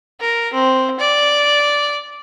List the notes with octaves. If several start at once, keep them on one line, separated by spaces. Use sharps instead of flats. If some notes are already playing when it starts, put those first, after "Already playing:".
A#4
C4
D5